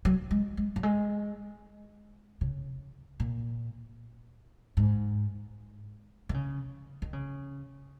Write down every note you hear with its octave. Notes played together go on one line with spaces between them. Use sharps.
F#3
G#3
G#3
F#3
G#3
C#3
A#2
G#2
D#3
C#3
D#3
C#3